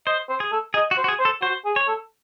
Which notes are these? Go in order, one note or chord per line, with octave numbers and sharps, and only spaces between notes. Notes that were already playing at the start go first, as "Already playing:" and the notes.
C5 D#5
C5
G#4
A4
G#4 D#5
F#4
C5
F#4
G#4
C5
A4
F#4 C5
G#4
C#5
A4